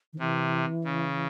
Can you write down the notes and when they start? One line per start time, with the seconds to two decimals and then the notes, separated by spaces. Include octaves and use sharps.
0.13 D#3
0.19 C3 E3
0.84 C#3